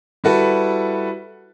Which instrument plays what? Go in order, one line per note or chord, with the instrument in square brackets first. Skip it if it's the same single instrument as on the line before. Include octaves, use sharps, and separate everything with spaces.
[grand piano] G3 E4 F#4 A4 B4